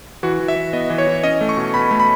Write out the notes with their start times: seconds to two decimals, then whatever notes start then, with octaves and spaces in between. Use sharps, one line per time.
0.23 E3 F#4
0.40 E3
0.48 E5
0.56 E3
0.73 B3 D#5
0.90 E3
0.98 C#5
1.07 E3
1.24 C#4 D#5
1.41 A3
1.49 C#6
1.57 B2
1.74 B2 B5
1.91 A3
2.00 B5